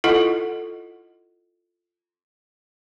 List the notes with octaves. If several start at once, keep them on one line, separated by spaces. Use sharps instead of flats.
E4 F4 A4 D#5 F#5